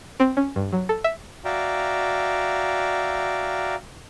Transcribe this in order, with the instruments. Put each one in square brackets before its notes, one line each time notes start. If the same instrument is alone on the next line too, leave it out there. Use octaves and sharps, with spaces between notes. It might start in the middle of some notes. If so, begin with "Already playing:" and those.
[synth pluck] C4
C#4
G2
F#3
A4
E5
[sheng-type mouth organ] F#4 D5 E5 F5 G5 A#5